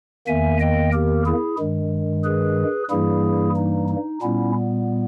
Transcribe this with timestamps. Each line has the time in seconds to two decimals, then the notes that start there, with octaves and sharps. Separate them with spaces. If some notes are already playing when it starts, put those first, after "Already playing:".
0.27 E2 D#3 A#3 E5 G#5
0.60 D#5 G5
0.93 G4 A#4
1.26 E4 G#4
1.59 G2 D#3 G#3
2.24 G#4 B4
2.90 G2 E3 G3 A#3 E4 G#4
3.56 D#4
3.89 D#4
4.22 A#2 G3 B3 C#4 E4